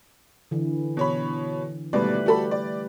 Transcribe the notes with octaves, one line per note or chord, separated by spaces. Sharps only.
D3 E3
B2 C#5 B5
G#1 B2 G3 A3 B4 D5
F#4 G4 A4 B5
D5